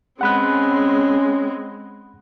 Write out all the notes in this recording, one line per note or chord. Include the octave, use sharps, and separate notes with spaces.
G#3 C4 C#4 F#5 B5 F#6